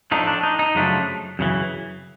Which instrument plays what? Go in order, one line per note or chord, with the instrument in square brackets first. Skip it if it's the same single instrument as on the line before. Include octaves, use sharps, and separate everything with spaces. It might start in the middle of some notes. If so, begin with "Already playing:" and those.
[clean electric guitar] A2 F3 A3 D4 D#4
D4
D#4
D#4
F#2 C#3 F3 A3 D4
F#2 C#3 E3